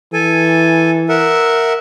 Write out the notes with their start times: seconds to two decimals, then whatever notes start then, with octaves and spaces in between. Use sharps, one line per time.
0.13 E3 A4 G#5
1.09 A#4 E5 F#5